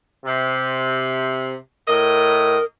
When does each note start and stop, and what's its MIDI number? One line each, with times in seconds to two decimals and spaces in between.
0.25 1.53 48
1.87 2.57 45
1.87 2.64 70
1.87 2.57 75